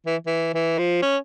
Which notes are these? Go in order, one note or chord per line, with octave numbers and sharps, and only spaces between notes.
E3
E3
E3
F3
C#4